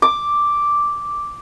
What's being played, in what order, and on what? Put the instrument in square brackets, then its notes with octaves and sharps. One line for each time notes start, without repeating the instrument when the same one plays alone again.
[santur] D6